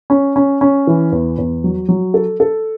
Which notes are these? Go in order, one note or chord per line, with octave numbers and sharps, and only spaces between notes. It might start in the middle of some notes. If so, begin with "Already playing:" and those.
C#4
C#4
C#4
E3
E2
E2
F#3
F#3
A4
A4